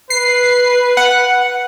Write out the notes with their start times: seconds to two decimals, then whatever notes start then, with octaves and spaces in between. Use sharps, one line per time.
0.10 B4 C7
0.97 F#5